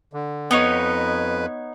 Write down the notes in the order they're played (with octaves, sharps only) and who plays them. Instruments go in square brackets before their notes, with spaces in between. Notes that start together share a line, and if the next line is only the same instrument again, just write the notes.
[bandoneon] D3
[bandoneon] F2 B4 [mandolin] B3 D#4 C#5